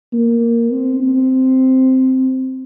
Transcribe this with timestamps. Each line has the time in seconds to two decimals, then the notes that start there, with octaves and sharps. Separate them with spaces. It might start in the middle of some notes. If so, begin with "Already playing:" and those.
0.13 A#3
0.71 C4
1.00 C4